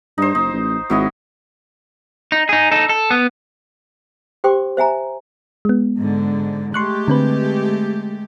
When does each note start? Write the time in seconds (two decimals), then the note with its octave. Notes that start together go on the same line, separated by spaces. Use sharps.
0.18 G2 D#4 C5
0.35 F#1 D#4
0.53 A1
0.90 G#1 F#3 E4 D#5
2.32 D#4
2.49 D#4 G#4
2.72 D#4 A4
2.89 A4
3.11 B3
4.44 G4 C5 G5 C6 D6
4.77 C5 E5 G#5 A#5
5.65 G#3 B3
6.00 G#2 D3
6.74 G#3 A3 G4 C6 C#6 F#6
7.08 D3 C4 B4